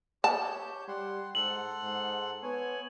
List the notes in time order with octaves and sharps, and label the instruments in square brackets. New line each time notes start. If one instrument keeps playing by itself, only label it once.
[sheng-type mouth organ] G4 C#5 G6 [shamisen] A5
[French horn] G3 [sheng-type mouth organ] F#5 C6
[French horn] G#2 [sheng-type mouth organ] A4 F#5 C6 [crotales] F#7
[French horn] G#2
[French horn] B3 [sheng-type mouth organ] C#5 G#5